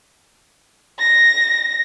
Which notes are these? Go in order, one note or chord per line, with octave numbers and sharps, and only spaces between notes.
A#6